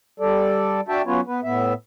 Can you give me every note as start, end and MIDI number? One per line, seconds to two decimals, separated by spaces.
0.20 0.81 55
0.20 0.81 69
0.20 0.81 74
0.88 1.02 62
0.88 1.02 66
0.88 1.02 76
0.88 1.02 79
0.88 1.02 81
1.06 1.21 54
1.06 1.21 59
1.06 1.21 61
1.06 1.21 65
1.06 1.21 71
1.06 1.21 73
1.27 1.40 59
1.27 1.40 71
1.44 1.74 45
1.44 1.74 59
1.44 1.74 76